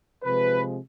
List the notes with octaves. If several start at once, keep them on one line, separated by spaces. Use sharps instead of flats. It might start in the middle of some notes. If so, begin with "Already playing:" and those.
C3 F3 G#3 B4